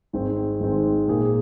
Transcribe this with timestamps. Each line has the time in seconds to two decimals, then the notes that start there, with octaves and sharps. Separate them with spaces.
0.13 G#1 G#2 D#3 G#3 C4
0.60 G#1 G#2 D#3 G#3 C4
1.08 A#2 A#3 G#4